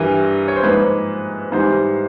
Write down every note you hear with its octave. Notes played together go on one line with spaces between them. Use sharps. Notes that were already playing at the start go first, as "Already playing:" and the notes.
Already playing: G2 E3 G3 A#4
C#5
C5
G#2 F3 A#3 B4
G#2 E3 G3 C5